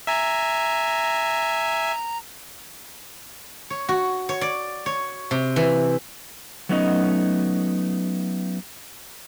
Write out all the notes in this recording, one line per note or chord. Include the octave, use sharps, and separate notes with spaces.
E5 G#5 A#5
C#5
F#4
C#5
D5
C#5
C3
E3
F#3 A3 B3 C#4 D#4 D#5